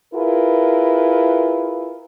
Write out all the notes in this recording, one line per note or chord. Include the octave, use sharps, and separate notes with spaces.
E4 F4 G#4 A#4 B4